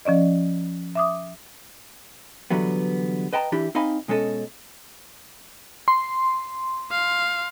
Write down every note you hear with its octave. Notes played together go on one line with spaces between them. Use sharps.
F3 C#4 D5 D#5
E5 D6 D#6
D3 E3 F#3 G3 B3
B4 D#5 G5 A5 A#5
E3 D4 E4 G4
C4 D#4 D#5 F5 G#5 B5
B2 G#3 C#4 A4 D#5
C6
F5